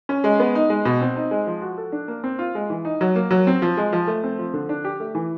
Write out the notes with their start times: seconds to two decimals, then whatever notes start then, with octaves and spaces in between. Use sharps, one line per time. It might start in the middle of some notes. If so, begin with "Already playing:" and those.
0.09 C#4
0.24 G#3
0.40 B3
0.55 D#4
0.70 G#3
0.85 B2
1.01 C4
1.16 D#4
1.31 G#3
1.47 F3
1.62 F#4
1.78 A4
1.92 D4
2.08 A#3
2.24 C4
2.39 F4
2.55 G#3
2.70 E3
2.85 D#4
3.01 F#3
3.15 A#3
3.31 F#3
3.47 C4
3.62 F3
3.77 G#3
3.93 F3
4.07 A3
4.23 C4
4.39 F3
4.54 D3
4.69 D4
4.85 G4
5.00 A3
5.15 E3